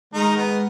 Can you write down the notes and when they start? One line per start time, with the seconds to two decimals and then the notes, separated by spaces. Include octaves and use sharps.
0.14 D#3 G#3 D#4
0.36 B3